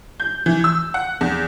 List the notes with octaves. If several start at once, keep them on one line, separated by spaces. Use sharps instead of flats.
G6
E3
E6
F#5
E2